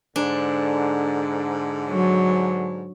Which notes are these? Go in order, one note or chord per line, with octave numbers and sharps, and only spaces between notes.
G#2 D3 D4
F#3